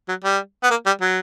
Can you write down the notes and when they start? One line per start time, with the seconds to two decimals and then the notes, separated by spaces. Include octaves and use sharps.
0.08 F#3
0.24 G3
0.63 B3
0.70 A#3
0.86 G3
1.01 F#3